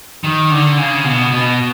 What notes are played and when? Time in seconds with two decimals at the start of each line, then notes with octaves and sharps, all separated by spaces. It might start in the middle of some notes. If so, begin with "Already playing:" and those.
0.24 D#3
0.51 D3
0.78 C#3
1.05 B2
1.31 B2